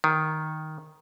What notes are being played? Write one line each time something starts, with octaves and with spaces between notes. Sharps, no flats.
D#3